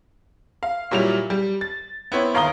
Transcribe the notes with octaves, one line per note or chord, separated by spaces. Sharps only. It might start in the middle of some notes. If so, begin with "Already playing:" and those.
F5
A#2 F#3 G3 E4 F7
G3
A6
B3 C4 E4 C#5
G1 D#2 F5 A#5 D#6 G7